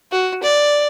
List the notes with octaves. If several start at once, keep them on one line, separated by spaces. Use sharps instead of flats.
F#4
D5